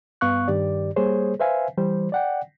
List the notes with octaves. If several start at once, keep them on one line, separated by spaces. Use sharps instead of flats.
G2 B3 F5 C#6 F#6
G2 D#3 G4 D5
G3 A#3 G#4 C5 C#5
B4 C5 E5 F5 G#5
E3 G3 C5
D5 F#5 G5